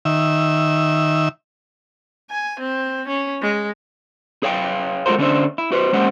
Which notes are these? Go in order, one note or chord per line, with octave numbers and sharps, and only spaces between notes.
D#3 E5
G#5
C4
C#4
G#3
G#4 C#5 F5 G5
G#3 A3 F4 F#4 A#4 C5
D3 C#4 D4 F#4 C5 E5
E4
F#4 B4 C5
G#3 A#3 C#4 G4 C5 F#5